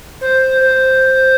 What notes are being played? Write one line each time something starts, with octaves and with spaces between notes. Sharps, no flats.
C5
C5